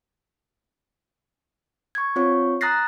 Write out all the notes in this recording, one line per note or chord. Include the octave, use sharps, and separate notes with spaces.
C#6 G#6
C4 F4 C#5 C#6
A#5 D#6 F#6 A6 A#6 C7